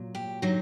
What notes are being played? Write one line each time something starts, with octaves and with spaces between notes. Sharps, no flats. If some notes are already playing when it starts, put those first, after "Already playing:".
Already playing: A#2 F#3
G4
D3 F#3 D#4